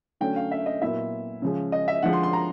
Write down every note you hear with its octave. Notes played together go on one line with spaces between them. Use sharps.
D3 F#3 A3 C#4 G5
F5
E5
D#5
A#2 F#3 B3 E4 E5
C#3 F3 G#3
D#5
E5
D3 F3 G#3 F#5
C6
C6
A#5